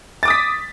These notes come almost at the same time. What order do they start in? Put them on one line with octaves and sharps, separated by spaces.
A6 D6 D#6 B6